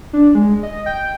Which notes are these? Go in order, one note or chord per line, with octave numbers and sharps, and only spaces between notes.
D4
G#3
D#5
G5